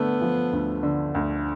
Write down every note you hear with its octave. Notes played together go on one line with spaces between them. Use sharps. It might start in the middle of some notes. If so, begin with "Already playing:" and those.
Already playing: D3 A3 B3
F3
D2
D3
D2